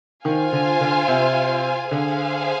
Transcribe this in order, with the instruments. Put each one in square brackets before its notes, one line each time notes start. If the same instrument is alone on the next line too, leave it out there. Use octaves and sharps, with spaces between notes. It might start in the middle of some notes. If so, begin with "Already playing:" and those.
[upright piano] D#3 [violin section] F4 C5 F5 G#5
[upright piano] D3
D3
C3
[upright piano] D3 [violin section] G#4 C5 F5 G#5